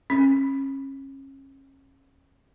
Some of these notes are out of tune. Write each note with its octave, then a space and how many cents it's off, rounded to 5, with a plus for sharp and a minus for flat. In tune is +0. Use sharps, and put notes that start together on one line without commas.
C#4 -30